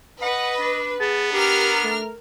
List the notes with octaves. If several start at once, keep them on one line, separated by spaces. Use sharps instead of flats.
B4 D#5 F#5
D4
B3 G#4 A5
D4 G4 A#4 F6
A3